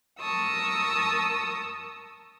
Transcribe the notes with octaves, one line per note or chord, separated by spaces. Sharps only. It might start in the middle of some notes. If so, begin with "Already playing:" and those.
A#4 A5 C#6 D#6 E6